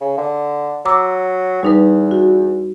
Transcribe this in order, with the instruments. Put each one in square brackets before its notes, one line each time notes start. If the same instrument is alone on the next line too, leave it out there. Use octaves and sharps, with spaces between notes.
[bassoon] C#3
D3
[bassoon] F#3 [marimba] A#5 D6 E6
[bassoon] E2 [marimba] G3 D#4 B4
[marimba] F#4